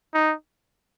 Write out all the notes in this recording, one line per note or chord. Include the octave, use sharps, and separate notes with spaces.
D#4